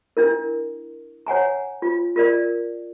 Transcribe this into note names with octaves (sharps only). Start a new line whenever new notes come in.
D4 E4 A#4
C#5 F#5 G#5 A#5
F4
F4 A#4 D5